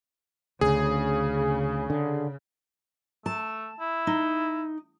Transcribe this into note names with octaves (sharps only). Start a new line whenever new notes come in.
D2 C#3 G#4
D3
A3 A5
E4
D#4